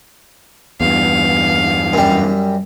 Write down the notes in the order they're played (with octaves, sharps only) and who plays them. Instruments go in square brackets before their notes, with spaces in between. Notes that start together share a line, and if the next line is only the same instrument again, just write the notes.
[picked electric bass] E2 G2 [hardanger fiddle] F5
[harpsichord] F#2 G3